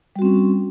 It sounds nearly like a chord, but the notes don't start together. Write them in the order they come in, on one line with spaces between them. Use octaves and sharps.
G3 F#4 C4 C#4